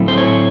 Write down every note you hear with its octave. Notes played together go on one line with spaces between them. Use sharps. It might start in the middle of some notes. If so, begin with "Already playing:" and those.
Already playing: A2 F#3 A3 C4 E4
C5
C#5